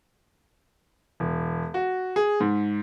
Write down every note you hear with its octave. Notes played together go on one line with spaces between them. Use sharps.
E1
F#4
G#4
G#2